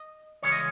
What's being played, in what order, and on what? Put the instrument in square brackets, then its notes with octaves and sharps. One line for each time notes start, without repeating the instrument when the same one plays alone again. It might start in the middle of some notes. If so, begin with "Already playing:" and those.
Already playing: [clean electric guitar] D#5
C#3 E3 G#3 C#4 C#5
D#5